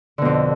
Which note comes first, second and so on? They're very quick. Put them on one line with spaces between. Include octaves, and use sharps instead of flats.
D3 B2 F2